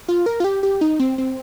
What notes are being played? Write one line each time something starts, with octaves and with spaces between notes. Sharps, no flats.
F4
A#4
F4
G4
G4
D#4
C4
C4